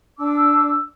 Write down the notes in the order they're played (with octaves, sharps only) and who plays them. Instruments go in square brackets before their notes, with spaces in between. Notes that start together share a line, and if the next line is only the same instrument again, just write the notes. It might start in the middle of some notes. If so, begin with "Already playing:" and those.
[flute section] D4 A5 D6 E6